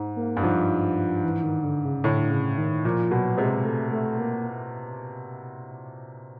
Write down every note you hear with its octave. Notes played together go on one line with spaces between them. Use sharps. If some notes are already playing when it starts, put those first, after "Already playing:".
Already playing: G#2
A#3
G2
G#2 F3
E3
D#3
D3
C#3
A2 D3
C#3
D#3
A#2 F3
B2 F#3
C3 G#3
A3
A3
A#3